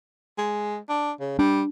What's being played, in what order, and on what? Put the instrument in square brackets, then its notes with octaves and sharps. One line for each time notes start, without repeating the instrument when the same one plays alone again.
[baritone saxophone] G#3
D4
C#3
[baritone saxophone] G3 [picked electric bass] D4